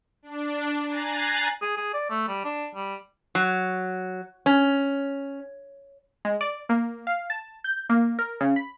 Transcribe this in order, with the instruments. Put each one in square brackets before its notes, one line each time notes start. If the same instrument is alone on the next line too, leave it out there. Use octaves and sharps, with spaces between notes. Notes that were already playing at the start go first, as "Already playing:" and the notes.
[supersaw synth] D4
G#5 A#5 F#6 A6 C7
[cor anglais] G#4
G#4
D5
A3
G3
D4
G3
[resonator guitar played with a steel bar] F#3
C#4
[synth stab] G#3
D5
A#3
F5
A5
G6
A#3
A#4
C#3
B5